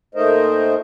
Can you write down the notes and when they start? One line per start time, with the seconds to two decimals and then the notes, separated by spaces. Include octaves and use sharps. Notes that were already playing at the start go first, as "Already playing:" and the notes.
0.15 A#2 A3 D#4 A#4 C5 D#5